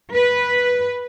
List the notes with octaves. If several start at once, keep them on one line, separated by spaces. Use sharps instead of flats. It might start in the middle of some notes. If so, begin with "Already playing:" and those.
B4